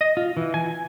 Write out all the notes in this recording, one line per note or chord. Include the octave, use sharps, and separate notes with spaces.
D#5
F4
E3
G#5
G#5